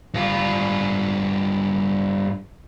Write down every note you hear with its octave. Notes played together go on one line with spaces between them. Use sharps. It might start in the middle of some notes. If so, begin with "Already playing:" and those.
G2 F4